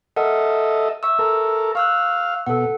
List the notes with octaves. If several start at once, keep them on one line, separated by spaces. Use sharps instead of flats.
A4 A#4 D#5 E5 F#5
E5 C#6 E6
A4 A#4
F5 C#6 E6 F#6
B2 A4 F#5